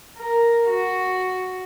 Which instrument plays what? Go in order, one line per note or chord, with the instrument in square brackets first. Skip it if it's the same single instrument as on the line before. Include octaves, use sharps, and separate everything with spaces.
[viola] A#4
F#4